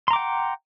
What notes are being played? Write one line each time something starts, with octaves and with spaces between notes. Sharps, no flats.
F#5 G5 A#5 C6 D6